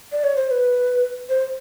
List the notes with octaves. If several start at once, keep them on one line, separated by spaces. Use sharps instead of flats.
D5
C#5
C5
C5
B4
C5